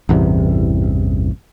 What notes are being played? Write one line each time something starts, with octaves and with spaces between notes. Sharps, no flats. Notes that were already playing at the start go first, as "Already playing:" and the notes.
A1 E2 G2 C3